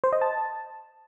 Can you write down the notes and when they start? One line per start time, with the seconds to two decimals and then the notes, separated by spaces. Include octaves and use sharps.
0.04 C5
0.13 D#5
0.22 A5